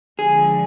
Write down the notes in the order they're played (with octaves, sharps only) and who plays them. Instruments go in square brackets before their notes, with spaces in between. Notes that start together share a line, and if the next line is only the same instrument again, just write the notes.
[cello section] D3 F3 G#3 [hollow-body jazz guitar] G#4